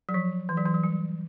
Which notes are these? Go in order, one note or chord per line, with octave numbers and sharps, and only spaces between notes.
F#3
F3
E3
F#3
E3
F#3
G3